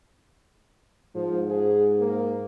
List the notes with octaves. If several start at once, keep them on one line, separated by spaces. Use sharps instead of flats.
G#2 F3
G#4
A#3